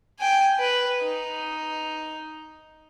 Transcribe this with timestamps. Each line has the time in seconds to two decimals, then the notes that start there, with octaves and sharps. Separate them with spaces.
0.19 G5 G#5
0.60 B4
1.03 D#4